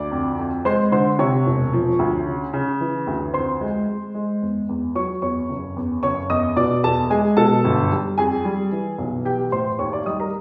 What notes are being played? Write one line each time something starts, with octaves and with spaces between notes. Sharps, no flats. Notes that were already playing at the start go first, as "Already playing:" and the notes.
Already playing: D2 D5 D6
F2
F2
G#3 C5 C6
D3 C5 C6
C3 C#5 C#6
E1
F3
D2
C#3
C#3
E3
D2
F2 C5 C6
G#3
G#3
G#3
E2
E2
F#3 C#5 C#6
E2 C#5 C#6
F#1
E2
F#1 C#5 C#6
E2 D#5 D#6
B2 D5 D6
E2 A4 A5
G#3 G#4 G#5
B2 A4 A5
G1
G3
F2 G#4 G#5
G3
E3
B1
E3 G4 G5
A2 C5 C6
D#2 C#5 C#6
D5 D6
G3 D#5 D#6
A#4 A#5